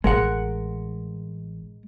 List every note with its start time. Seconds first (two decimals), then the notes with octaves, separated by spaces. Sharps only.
0.04 A1 G#3 A#4 F#5